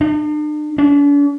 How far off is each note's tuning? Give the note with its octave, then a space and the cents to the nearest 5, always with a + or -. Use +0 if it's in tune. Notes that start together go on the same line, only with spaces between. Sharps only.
D4 +40
D4 -45